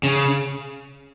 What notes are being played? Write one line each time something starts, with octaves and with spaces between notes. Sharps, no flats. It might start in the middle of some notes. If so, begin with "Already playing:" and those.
C#3